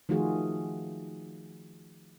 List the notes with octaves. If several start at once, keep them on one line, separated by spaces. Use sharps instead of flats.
D#3 F3 A3 F4 F#4 G#4